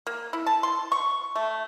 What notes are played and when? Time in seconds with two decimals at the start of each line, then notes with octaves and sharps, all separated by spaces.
0.07 A#3
0.33 E4
0.46 A5
0.63 C6
0.92 C#6
1.35 A3